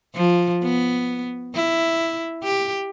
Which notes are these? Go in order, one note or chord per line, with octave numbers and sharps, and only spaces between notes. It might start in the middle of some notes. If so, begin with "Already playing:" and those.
F3
B3
E4
G4